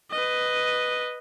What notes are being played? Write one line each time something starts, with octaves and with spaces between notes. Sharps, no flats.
B4 D#5